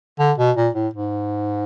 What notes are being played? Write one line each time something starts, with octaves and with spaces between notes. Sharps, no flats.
D3
B2
A#2
A2
G#2